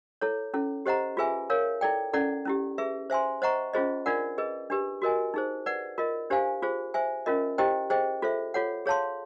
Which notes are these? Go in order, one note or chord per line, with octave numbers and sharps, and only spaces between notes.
E4 A4 C#5
C#4 E4 A4
G4 C5 D#5 F#5 A#5
F4 G#4 B4 E5 G#5
A#4 C#5 F5
E4 A4 D5 G5
C#4 E4 A4 D5 F#5
C#4 E4 G4
G#4 B4 E5
C5 E5 G#5 C6
C5 D#5 F#5 A#5 C#6
C#4 F4 G#4 C5 D#5
D4 F4 A#4 D5 F#5
G#4 B4 D#5
D4 G4 B4
F#4 A#4 D#5 G#5
D#4 G#4 C5
B4 D5 F#5
F4 A#4 D#5
D4 G4 C5 F5 G#5
F4 G#4 C5
C5 E5 G#5
C#4 F4 A#4 D#5
E4 G4 C5 D#5 G5
G#4 C5 D#5 G5
F4 A4 C5 E5
F4 A4 C#5 F#5
G#4 C#5 F5 A5 C6